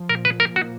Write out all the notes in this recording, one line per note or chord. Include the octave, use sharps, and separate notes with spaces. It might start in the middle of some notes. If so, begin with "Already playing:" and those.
Already playing: F3
A#2 A#4
B4
A#3 A#4
F#4